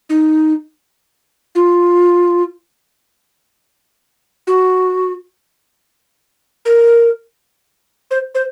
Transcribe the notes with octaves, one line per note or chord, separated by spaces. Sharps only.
D#4
F4
F#4
A#4
C5
C5